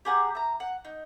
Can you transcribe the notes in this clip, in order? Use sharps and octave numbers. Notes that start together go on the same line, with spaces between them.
G4 G#4 F#5 A#5
E5 A#5
F#5
D#4